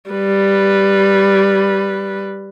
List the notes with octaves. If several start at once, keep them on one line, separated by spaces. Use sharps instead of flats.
G3 B4